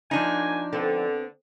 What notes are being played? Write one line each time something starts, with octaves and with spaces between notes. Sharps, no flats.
F3 F#3 A#3 D4 D#4 G#5
D3 B3 C4 A4